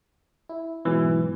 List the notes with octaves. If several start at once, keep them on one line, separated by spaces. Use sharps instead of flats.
E4
G#2 B2 E3 F#3